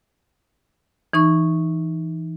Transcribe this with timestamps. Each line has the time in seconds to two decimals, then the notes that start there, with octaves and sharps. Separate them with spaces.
1.13 E3 D#4 C#6